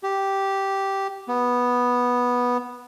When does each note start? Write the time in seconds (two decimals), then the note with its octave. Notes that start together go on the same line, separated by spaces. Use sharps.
0.03 G4
1.28 B3